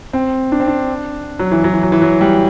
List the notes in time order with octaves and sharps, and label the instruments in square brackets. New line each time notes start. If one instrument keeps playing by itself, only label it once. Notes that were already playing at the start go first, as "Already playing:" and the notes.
[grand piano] C4
D4
C4
D4
F#3
E3
F#3
E3
F#3
E3
F#3
G3